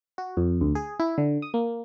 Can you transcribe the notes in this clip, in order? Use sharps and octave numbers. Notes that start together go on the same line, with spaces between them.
F#4
F2
D2
G#4
E4
D3
D#6
A#3